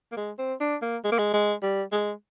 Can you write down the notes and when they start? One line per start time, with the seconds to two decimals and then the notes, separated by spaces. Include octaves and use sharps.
0.12 A#3
0.17 G#3
0.38 C4
0.61 D4
0.82 A#3
1.04 G#3
1.12 A#3
1.19 G#3
1.33 G#3
1.63 G3
1.92 G#3